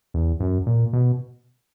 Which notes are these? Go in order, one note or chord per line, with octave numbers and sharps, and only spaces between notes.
E2
F#2
A#2
B2